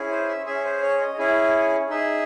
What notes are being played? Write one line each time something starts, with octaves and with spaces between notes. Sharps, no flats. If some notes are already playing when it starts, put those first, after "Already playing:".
Already playing: C#4 E4 G#4
C5
E5
C#4 G#4 E5
C5
C#5
D#5
C#4 E4 G#4
D#4 G#4 E5